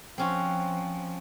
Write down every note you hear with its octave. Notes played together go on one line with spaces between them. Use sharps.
F3 C4 C#4 F#4